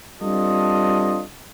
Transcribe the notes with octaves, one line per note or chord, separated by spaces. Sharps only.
G3 C4 D4 F4 A4 D#5